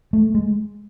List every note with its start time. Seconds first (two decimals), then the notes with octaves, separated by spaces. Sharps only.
0.13 A3
0.34 G#3